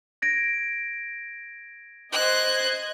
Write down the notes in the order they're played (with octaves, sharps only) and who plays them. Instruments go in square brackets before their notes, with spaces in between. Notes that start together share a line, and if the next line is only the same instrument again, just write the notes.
[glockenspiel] G#6 A#6 D7
[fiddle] C5 F#6 [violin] D#5 G#6